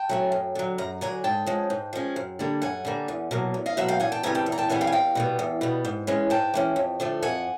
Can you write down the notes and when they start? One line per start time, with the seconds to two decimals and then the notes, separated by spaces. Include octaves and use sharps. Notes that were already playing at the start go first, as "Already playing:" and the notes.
Already playing: G5 A5
0.09 F#3 A3 C#4
0.32 F#2
0.55 D3 F#3
0.78 F#2 A#5
1.01 D3 F#3 G#5 A#5
1.24 G#2 G5 A5
1.46 F3 G#3 C#4
1.70 G#2
1.93 F3 G#3 C#4
2.16 F#2
2.39 D3 G3 A#3
2.62 F#2 F#5 G#5
2.85 D3 G3 A#3
3.08 E2
3.31 B2 F#3 A#3
3.54 E2
3.66 D#5 F5
3.77 B2 F#3 A#3 E5 F#5
3.88 F5 G5
4.00 E2 F#5 G#5
4.12 G5 A5
4.23 C#3 E3 G3 C4 G#5 A#5
4.35 G5 A5
4.46 E2
4.52 A#5
4.58 G5 A5
4.69 C#3 E3 G3 C4 F#5 G#5
4.81 F5 G5
4.87 G#5
4.92 E2 F5 G5
5.15 B2 G3 B3
5.39 E2
5.61 B2 G3 B3
5.85 G#2
6.07 E3 G#3 C#4
6.30 G#2 G5 A5
6.54 E3 G#3 C#4
6.76 F2
7.00 D3 F3 A3
7.23 F2 F#5 G#5